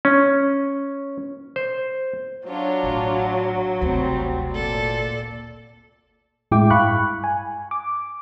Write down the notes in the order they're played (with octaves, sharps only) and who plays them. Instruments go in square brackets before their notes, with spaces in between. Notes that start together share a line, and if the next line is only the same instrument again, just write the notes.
[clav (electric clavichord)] C#4
C5
[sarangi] F#3 [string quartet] D4 F4 C#5
[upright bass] A1
[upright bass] G1 D2 [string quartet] C3 G3 C4
[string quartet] A#2 A4 D5
[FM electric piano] A2 G#3 E4 G5 D6
G2 F5 B5 C#6 F#6
G#5
D6